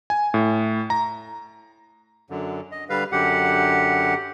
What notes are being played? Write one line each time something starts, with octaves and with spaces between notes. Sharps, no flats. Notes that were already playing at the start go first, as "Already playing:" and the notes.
G#5
A2
A#5
F#2 D3
D#5
D3 G3 B4 F5
F#2 D3 G4 F#5